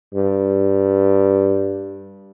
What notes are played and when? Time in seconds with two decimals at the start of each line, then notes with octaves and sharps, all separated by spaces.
0.15 G2